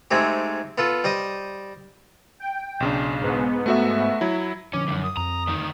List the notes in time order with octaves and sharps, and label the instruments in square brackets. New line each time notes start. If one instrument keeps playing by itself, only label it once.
[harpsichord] G#2 G#3 A3 C4 G4
B3 F4 A4
G3 C5 D#5 D#6
[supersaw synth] G5
[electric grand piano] B1 C#3 D4
[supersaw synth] G#2 B3
[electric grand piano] A3 F#4 E5
F#3 E4
[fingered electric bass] D3 F3 D4 [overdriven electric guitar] C#4 [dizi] D6
[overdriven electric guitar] C2 F#2
[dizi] D#6
[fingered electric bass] F2 [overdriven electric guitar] A#5
[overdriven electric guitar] D2 D#3